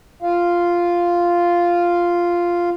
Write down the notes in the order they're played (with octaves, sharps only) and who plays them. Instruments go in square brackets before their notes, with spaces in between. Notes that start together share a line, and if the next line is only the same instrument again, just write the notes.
[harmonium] F4 F5